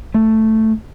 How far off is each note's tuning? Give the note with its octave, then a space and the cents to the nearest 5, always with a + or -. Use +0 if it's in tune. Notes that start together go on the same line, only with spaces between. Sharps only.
A3 +5